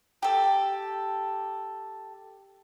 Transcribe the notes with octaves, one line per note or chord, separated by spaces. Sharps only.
G4 A4